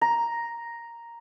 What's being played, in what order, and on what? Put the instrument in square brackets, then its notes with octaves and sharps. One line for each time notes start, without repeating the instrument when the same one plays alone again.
[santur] A#5